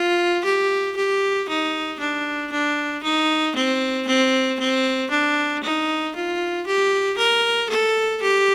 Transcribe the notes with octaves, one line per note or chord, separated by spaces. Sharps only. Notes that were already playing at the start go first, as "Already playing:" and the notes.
Already playing: F4
G4
G4
D#4
D4
D4
D#4
C4
C4
C4
D4
D#4
F4
G4
A#4
A4
G4